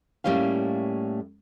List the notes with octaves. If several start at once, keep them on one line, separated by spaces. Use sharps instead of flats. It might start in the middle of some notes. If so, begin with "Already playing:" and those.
A2 G3 A#3 C#4 F5